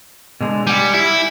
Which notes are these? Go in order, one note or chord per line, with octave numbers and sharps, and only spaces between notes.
B2 D3 G#3
G3 F#5 G#5
E4